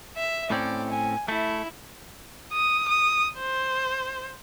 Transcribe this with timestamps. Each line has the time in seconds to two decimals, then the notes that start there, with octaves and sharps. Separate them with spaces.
0.17 E5
0.51 A2 C4 C#4 D5
0.90 G#5
1.28 A3 E4
2.53 D#6
2.88 D#6
3.39 C5